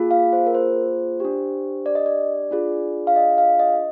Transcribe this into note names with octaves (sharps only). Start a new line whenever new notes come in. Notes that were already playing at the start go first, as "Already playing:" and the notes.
Already playing: A#3 F4 G#4
F5
C5
A#4
C5
D4 G4
D5
D#5
D5
D4 F4 G#4
F5
D#5
F5
D#5